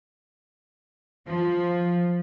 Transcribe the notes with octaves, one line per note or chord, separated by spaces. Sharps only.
F3